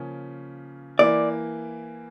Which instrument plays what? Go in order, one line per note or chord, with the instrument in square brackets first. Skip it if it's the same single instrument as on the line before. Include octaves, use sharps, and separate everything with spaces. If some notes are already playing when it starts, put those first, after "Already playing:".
Already playing: [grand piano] C#3 F3 A#3 C#4
[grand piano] E3 A#3 E4 [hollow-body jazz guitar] D5